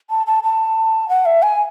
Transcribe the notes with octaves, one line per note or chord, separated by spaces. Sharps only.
A5
A5
A5
F#5
E5
G#5